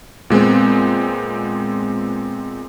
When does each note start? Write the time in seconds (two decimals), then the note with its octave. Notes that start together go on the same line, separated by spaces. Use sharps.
0.30 A#2 G#3 B3 C4